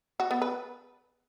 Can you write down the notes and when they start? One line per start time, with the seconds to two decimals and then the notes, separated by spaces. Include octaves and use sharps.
0.20 F#4
0.31 B3
0.42 B4